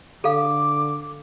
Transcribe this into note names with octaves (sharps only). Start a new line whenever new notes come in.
D3 A4 F5 D6